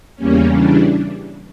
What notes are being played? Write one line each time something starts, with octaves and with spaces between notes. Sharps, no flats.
E2 C#3 G3 A#3 C#4
C#3 E3 G3 D4